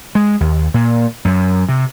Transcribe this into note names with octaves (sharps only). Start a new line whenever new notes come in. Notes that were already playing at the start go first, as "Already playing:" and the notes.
G#3
D#2
A#2
F#2
C3